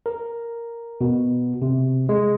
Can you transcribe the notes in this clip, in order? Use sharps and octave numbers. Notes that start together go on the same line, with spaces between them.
A#4
B2
C3
G#3